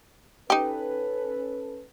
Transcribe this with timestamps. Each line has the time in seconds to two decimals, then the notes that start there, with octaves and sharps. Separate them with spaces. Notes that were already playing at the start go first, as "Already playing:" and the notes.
0.50 C#4 D#4 G4 A4 B4